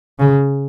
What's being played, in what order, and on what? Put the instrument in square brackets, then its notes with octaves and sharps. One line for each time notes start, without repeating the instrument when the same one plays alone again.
[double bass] C#3